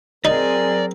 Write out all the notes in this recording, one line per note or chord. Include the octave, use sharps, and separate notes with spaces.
F#3 C4 D#4 G#4 A#4 D5